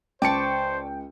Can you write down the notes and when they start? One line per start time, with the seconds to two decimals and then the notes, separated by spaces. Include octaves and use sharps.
0.22 C#2 C5 D5 G5 A5 C#6 C#7